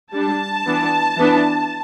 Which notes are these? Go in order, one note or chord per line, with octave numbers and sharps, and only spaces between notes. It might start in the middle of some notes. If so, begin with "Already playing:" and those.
G3 D4 A5
E3 B3 D4
E3 B3 D4